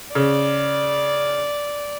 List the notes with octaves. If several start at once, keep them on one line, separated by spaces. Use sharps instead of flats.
C#3 D5